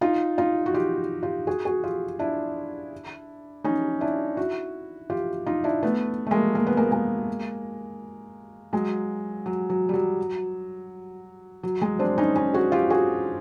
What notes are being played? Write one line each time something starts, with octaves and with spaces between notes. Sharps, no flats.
D#4 F4
D#4 F4
F#4
F4 G4
F4 G4
F#4 G#4
F#4 G#4
F4 G4
D4 E4
C#4 D#4
D4 E4
E4 F#4
F4 G4
D#4 F4
D4 E4
A3 B3
A3
G#3 A#3
A#3
B3
G#3 A#3
G#3 A#3
F#3 G#3
F#3
F#3
G3
F#3
F#3
F#3 G#3
C4 D4
C#4 D#4
C#4 D#4
F#4 G#4
F4 G4
F#4 G#4